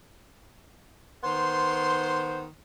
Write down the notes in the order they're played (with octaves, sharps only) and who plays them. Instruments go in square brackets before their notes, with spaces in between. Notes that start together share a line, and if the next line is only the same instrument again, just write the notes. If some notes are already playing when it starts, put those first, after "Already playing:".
[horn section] D#3 B3 C5 [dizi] C6